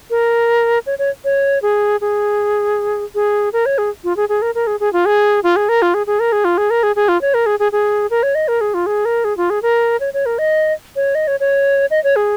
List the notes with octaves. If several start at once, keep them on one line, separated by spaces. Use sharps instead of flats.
A#4
C#5
C#5
C#5
G#4
G#4
G#4
A#4
C#5
G#4
F4
G#4
G#4
A#4
A#4
G#4
G#4
F4
G#4
F4
G#4
A#4
F4
G#4
G#4
A#4
G#4
F4
G#4
A#4
G#4
G#4
F4
C#5
A#4
G#4
G#4
G#4
A#4
C#5
D#5
A#4
G#4
F4
G#4
A#4
G#4
F4
G#4
A#4
C#5
C#5
A#4
D#5
C#5
D#5
C#5
C#5
D#5
C#5
G#4